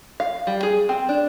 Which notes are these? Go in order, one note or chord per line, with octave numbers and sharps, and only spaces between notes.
F5
G3
G#4
C4
D4